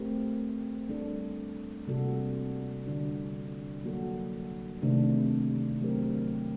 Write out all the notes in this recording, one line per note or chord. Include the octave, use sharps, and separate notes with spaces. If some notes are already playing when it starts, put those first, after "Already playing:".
Already playing: A3 C4 G4 A#4
G3 D4 A4
C3 G3 A#3 F#4 A4
D3 G3 D4 F#4
F#3 A#3 F#4 A4
C3 D#3 A3 D4
F#3 A3 C4 G4 A#4